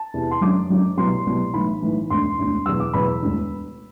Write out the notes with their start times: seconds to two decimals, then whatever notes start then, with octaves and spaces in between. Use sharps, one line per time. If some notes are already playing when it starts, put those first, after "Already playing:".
Already playing: A5
0.14 E2 C3 E3
0.31 C6
0.41 F#1 F#2 D3 F#3 D6
0.69 F#1 F#2 D3 F#3
0.97 C2 B2 F#3 C6
1.26 C2 B2 F#3
1.54 B1 A2 E3 B5
1.82 B1 A2 E3
2.10 E1 D2 D3 C6
2.38 E1 D2 D3
2.66 E2 B2 F#3 E6
2.80 D6
2.94 E2 B2 F#3 B5
3.22 E1 D2 D3